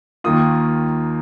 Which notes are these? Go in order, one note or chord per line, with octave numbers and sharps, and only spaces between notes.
D#2 D#3 A#3 F4 D#6